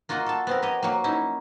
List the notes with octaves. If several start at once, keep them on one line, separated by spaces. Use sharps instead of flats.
A#3 F4 F#4 D#5 F#5
A4 A5
B3 C4 A#4
G4 C#5 D#5
F#3 A#3
C#4 D#4 E4